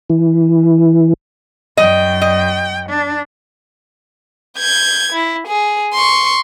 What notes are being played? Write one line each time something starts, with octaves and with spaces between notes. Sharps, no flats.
E3
F#2 D#5 G5
D#5
D4
G6 G#6
E4
G#4
C6 C#6